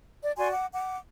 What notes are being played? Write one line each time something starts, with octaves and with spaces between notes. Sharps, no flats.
D5
F#4 D5 G#5 C6
F#5 D6
F#5 D6